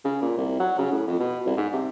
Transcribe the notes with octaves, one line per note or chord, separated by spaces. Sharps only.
C#3
A#2
C2
F#3
C#3
A2
F2
B2
C2
G#2
C3